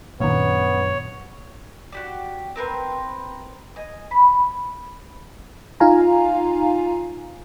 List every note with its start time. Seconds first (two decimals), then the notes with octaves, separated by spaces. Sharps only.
0.20 A#1 F#2 A#2 D#3 B3 C#5
1.92 F#4 G4 D5
2.56 C4 A#4 B4 C6
3.76 D#5 G#5
4.11 B5
5.80 D#4 F4 F5 G#5 A#5